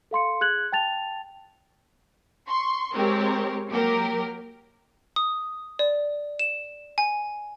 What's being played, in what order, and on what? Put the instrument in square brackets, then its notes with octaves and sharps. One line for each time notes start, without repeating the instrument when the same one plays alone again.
[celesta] A4 F5 C6 C#7
G#4 F#6 G#6 F#7
G5 A5 A6 F7
[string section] C6 C#6
G#3 C4 G4 A#4 C#5
F#3 A#3 G4 A#4
[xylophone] D#6
D5
E7
G#5